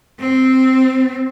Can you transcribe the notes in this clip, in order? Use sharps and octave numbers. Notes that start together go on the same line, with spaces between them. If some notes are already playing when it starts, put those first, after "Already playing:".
C4